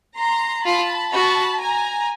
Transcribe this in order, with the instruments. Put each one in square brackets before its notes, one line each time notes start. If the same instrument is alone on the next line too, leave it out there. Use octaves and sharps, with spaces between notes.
[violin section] A#5 C6
[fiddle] F4 [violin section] A5 B5
[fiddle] F#4 [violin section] A5 B5
[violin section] G#5 A#5